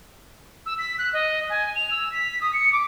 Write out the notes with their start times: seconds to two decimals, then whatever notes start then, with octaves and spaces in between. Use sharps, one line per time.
0.66 E6
0.79 B6
0.99 F#6
1.13 D#5
1.50 G#5
1.75 F7
1.91 E6
2.12 B6
2.41 D#6
2.53 C#7
2.72 D6